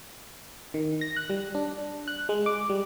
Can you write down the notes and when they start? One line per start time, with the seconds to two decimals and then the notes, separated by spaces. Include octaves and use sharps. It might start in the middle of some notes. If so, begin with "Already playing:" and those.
0.74 D#3
1.01 A#6
1.16 F#6
1.30 G3
1.55 D4
2.08 F#6
2.29 G#3
2.46 D6
2.69 G3